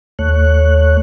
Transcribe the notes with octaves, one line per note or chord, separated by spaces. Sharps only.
D#2 A3 C#5 F#6